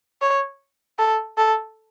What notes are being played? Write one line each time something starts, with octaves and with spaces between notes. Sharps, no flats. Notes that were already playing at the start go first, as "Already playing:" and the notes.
C#5
A4
A4